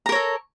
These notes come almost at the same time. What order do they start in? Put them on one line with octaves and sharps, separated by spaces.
A#5 A#4 C#5 A4